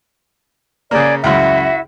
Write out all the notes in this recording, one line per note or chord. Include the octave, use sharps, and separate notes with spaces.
C#3 A#3 G#4 D5
C#2 F#2 E4 F#4 E5